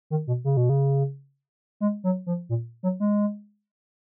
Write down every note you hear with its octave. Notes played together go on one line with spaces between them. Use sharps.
D#3
B2
C#3
B2
C#3
G#3
F#3
F3
A#2
F#3
G#3